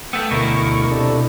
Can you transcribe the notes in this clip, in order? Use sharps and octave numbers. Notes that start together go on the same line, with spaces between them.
A3 B3 G5 E6
D2 B2 E4 A#4 C#6
C3 D4 A4